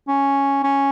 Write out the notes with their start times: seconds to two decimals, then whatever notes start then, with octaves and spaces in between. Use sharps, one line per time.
0.08 C#4
0.64 C#4